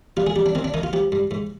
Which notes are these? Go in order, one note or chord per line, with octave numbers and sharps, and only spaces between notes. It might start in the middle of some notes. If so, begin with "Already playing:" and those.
G3 F4
G#4
G3 G4
D4
D#3 C4
D4
D#3 D#4
F4
F3 G4
G2
G#2